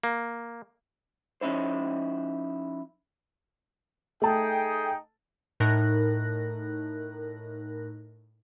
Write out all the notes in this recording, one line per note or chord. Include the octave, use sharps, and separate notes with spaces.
A#3
F3 C#4 D#4 E4 C5
A3 D#4 G#4 G5 A5
A2 D#4 A#4 F#6 A#6